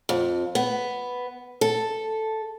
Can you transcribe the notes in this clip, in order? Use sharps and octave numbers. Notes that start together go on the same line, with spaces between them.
F2
B3
A4